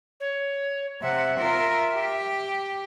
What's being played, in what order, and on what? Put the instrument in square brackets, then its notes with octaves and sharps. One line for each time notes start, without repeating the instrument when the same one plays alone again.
[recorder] C#5
[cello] C3 F#5 [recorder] E5
[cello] F4 A#4
G4